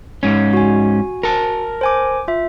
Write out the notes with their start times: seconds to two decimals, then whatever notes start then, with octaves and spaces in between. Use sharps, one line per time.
0.23 G#2 C#4
0.53 F#4 G#5
1.23 A#4 A5
1.81 C5 G#5 D6
2.28 F4 E5